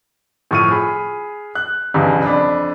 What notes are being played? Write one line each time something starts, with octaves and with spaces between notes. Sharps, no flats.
A2 F3 C#6 F6 D#7
G#4 B5
F#6
B1 E2 G2 C#3
F2 D4 B5